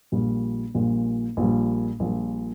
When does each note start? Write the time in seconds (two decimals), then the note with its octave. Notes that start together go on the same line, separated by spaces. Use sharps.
0.12 A#1 A#2 G3
0.75 A#1 A#2 G3
1.37 A#1 A#2 G3
2.00 A#1 A#2 G3